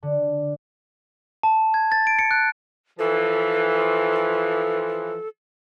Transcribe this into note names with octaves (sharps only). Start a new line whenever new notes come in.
D3
A5
G#6
A6
D7
C#7
F#6
E3 F3 A4